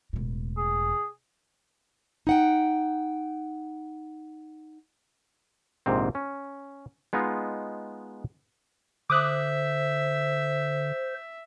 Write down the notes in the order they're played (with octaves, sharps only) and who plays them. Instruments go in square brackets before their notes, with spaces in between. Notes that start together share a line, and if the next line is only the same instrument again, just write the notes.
[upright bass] E1 A2
[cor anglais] G#4
[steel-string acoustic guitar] D#4 F#5 G5
[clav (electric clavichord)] A#1 G#2 C3 C4
C#4
G#3 B3 D#4 F4
[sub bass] D3 [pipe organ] C5 [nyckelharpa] E5 [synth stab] D6 D#6 F#6